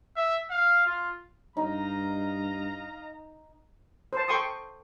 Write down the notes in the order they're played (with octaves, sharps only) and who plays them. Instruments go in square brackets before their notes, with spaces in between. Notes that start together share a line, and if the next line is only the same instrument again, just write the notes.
[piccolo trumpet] E5
F5
F4
[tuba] G2 [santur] D#4 [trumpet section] D#5 F5 A#5
[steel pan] C5 A5
A4 G5 C6 C#6 D#6